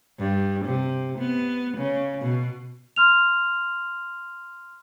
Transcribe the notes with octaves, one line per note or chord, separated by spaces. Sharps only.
G2
C3
B3
C#3
B2
C6 F6 F7